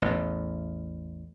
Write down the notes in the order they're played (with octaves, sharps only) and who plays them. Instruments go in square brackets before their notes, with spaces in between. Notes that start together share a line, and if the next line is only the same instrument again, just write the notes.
[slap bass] A1 E2